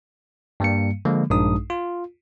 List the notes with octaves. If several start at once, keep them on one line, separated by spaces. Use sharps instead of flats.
G2 G3 A#3 C#7
D3 F3 G#3 A#3
A#1 G2 G#3 D4 D#4 D#6
F4